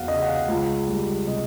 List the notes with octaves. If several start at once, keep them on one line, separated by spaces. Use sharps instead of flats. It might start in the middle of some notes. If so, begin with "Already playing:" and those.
Already playing: F1 E2 F#3 F5 F#5
C#3 D#5
F#5
F5
C#2
G3
C3 D#5